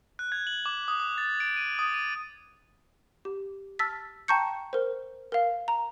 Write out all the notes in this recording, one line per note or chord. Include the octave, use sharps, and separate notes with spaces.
F#6
G#6
F#7
D6
D#6
D#6
A6
D7
D#7
D#6
D#7
G4
A5 E6 F6 A6 B6
G5 A5 A#5 C#6 G6 C#7
A#4 C5
A#4 F5
A#5